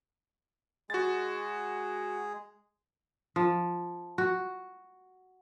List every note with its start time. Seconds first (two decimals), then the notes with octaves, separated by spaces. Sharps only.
0.90 G#3 F#4 G#4 A6
3.36 F3
4.18 F#4